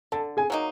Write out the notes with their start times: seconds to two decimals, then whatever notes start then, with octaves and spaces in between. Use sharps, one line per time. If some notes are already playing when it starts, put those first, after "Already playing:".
0.12 D3 A4 A5
0.37 G#4 G#5
0.50 F#3 A#3 D#4